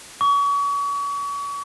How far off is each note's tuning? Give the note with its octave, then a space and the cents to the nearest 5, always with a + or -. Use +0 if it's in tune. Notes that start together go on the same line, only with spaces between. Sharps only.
C#6 +35